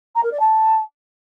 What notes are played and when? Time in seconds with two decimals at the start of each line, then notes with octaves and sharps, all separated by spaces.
0.15 A#5
0.23 A#4
0.31 D5
0.40 A5